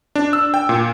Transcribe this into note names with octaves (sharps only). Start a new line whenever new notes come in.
D4
E6
G5
A#2